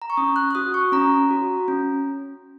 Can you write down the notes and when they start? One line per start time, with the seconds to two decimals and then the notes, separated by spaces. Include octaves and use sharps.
0.02 A#5
0.10 C#6
0.17 C#4 D#6
0.36 F#6
0.51 F#6
0.55 F#4 D#6
0.74 C#6
0.92 C#4 A#5
1.31 F#4
1.68 C#4